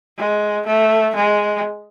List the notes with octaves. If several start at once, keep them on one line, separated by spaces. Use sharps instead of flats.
G#3
A3
G#3